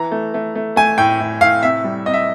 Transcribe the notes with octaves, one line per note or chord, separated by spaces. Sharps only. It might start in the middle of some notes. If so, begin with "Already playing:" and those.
Already playing: E3 A#5
A3
A3
A3
A3 G#5
A2 G5
A2
A2 F5
C3 E5
G3
C3 D#5
E5